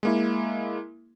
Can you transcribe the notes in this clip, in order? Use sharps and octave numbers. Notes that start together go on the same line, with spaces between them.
G#3 A#3 E4